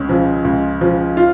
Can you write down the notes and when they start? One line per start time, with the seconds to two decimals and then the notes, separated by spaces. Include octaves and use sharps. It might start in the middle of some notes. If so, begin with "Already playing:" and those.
Already playing: C#2 C#4
0.09 C#3 F3
0.44 C#2
0.81 C#3 F3
1.17 F4